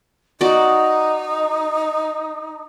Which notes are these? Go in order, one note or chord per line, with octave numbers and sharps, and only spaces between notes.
D#4 F#4 D5